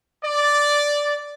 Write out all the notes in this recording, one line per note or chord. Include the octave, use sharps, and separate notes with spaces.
D5